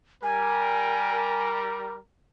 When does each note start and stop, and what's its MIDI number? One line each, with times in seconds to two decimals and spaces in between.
0.23 1.98 55
0.23 1.98 70
0.23 1.48 80